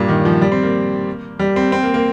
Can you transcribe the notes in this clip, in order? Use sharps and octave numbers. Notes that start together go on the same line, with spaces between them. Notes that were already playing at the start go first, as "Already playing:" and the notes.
Already playing: G2 A#2
D#3
F3
G3
C4
A#3
G3
C4
C4
A#3
A#3